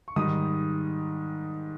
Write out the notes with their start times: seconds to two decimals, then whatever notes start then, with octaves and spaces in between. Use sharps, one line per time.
0.08 C#6
0.16 G#2 D#3 G3 D#6